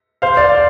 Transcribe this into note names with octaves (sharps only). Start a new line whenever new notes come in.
C5 F5
D5
F5